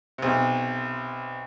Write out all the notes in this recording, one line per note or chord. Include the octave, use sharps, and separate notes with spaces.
B1 C3